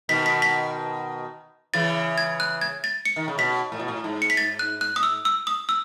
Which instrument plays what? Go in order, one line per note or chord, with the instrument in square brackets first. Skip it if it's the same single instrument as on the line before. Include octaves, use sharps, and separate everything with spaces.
[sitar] B2 D#3 [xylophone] B6
[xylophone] B6
B6
[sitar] C#3 E3 [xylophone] A6
[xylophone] G#6
F#6
G#6
A6
C#7
[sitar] D#3
C#3
[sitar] B2 [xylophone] B6
[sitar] A2
B2
A2
G#2
[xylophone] C#7
B6
A6
F#6
F#6
D#6
E6
E6
D#6
E6